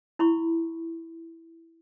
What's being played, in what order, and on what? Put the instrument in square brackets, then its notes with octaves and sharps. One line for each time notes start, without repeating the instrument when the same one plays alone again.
[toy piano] E4 B5 C#6